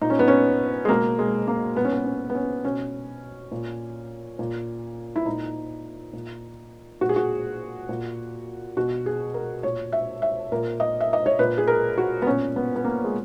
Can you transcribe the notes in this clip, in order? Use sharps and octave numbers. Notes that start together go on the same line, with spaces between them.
A#2 D#4
C#4
B3
C#4
G#3
B2 A#3
G#3
A#3
A#2 B3
C#4
B3
C#4
B3
C#4
B2 C#4
A#2
A#2
E4
A#2 D#4
A#2
A#2 F#4
G#4
F#4
A#2
B2 F#4
G#4
A#4
A#2 C#5
E5
E5
A#2 A#4
D#5
E5
D#5
C#5
A#2 B4
G#4
A#4
F#4
B3
A#2 C#4
B3
B3
A#3
G#3